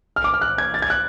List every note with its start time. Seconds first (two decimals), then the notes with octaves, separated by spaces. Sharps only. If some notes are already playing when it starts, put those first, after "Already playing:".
0.16 F6
0.24 D6
0.34 F6
0.41 F#6
0.58 G#6
0.74 A6
0.82 G#6
0.90 F#6